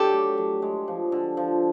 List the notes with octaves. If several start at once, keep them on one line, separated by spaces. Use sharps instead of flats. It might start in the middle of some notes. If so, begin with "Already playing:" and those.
Already playing: F#3 D4 G4 A4
A3
F#3
G#3
F3
D3
F3